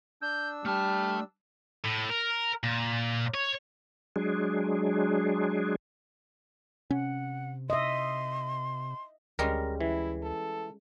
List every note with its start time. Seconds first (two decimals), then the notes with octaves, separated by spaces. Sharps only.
0.22 D4 E6 G6
0.65 G3 A3 A5 F6
1.84 A2
2.09 A#4
2.64 A#2
3.34 C#5
4.16 F#3 G#3 D4 G#4
6.90 C3 C#4 F#5
7.70 D#5 E5 C6
9.39 D2 G3 G#3 C#4 A#4
9.80 E3 E4
10.22 A4